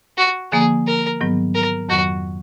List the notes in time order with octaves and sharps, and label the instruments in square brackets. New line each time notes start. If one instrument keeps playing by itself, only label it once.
[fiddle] F#4
[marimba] D3 F3 A#3 [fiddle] G#4
[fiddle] A#4
[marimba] G#2 D#3 F#3 B3
[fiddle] A#4
[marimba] F2 D#3 F#3 [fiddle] F#4